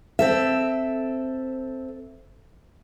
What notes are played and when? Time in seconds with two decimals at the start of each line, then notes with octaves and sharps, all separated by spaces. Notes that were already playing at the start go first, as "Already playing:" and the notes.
0.19 C4 A4 E5